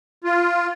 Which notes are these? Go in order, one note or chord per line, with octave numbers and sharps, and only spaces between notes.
F4